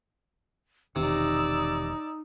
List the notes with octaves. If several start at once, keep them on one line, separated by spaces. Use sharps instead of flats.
E1 E2 C3 D#3 D#4 D5 E6